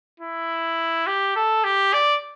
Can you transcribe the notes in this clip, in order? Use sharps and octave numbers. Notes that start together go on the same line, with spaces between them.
E4
G4
A4
G4
D5